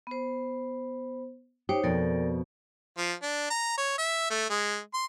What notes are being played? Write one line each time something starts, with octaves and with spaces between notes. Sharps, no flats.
B3 C5
D#4 G4 C5 C#5
F2 B2 A4 A#4 D5
F3
D4
A#5
C#5
E5
A3
G#3
C6